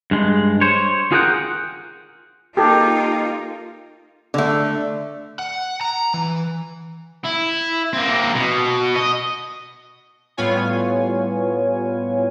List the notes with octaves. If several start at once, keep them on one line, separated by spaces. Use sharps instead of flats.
G2 G#3
C5 C#5
F4 G#4 A#4 D5 F#5 G5
A#3 D#4 F4 G4 A4
D3 A3
F#5
A#5
E3
E4
A#3 C4
B2
D#5
A2 G3 B3 F4 C#5 G#5